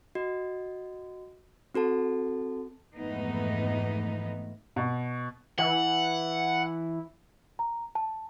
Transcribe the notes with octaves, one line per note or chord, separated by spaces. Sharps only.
F#4 D#5
C4 F#4 A4 A5
F2 G#2 E3 A3 B3 D#4
B2
E3 F#5
A#5
A5